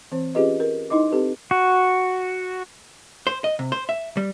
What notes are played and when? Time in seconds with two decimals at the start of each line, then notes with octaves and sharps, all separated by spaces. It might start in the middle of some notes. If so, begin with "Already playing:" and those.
0.12 E3 C4 C5
0.35 C#4 F4 G4 G#4 B4 D#5
0.60 A#4
0.90 D#4 E4 D#5 D6
1.12 C4 G4 A4 B4
1.51 F#4
3.27 C5
3.44 D#5
3.59 C3
3.72 C5
3.89 E5
4.17 G3